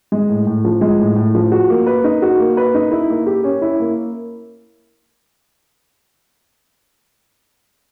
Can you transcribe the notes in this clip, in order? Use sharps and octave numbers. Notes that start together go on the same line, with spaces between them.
G#3
A2
A2
F3
G#3
A2
A2
F3
F#4
A#3
B4
D#4
F#4
A#3
B4
D#4
E4
A#3
G4
C#4
E4
A#3